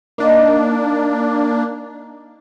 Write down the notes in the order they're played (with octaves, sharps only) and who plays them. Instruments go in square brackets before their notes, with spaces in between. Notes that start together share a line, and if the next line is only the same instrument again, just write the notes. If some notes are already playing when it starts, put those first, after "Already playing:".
[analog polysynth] A#3 D4 [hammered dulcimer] D#4